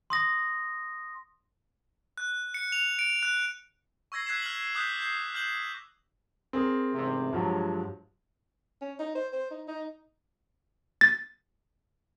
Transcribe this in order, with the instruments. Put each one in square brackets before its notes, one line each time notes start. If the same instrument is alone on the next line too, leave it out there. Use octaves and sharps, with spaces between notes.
[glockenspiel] C6 D#6 A#6
[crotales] F#6
C#7
F7
D7
F#6
C#6 E6 G#6 A#6 C7
E6 F#6 G#6 B6 C7 E7
F6 F7 F#7
D6 D#6 F#6 G6 B6
G6 C7
F6 G6 F#7
[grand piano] C4 G#4 A#4
[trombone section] A1 G#2 C3
[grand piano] G2 F3 G#3 [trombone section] F#3
[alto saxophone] C#4
D#4
C5
C5
D#4
D#4
[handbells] A6